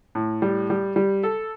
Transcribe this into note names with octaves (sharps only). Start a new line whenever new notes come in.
A2
G3
G3
G3
A4